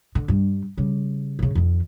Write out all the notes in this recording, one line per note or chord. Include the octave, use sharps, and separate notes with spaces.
D3
G2 G3
C#3 G3
F#2 C#3
F2 D#3